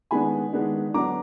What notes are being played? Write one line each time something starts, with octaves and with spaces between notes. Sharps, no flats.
D#3 G#3 B3 D4 G#5 B5
D#3 G#3 B3 D4
D3 F#3 B3 D4 A#5 D6